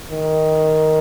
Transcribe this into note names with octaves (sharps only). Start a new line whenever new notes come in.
D#3